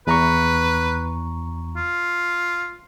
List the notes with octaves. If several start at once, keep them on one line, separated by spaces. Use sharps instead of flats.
E2 B4 A#5 C#6
F4